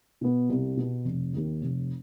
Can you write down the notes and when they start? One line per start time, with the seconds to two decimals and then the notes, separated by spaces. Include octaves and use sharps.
0.21 B2 B3
0.49 C2
0.77 B2 B3
1.05 F1
1.33 D#2 D#3
1.61 F1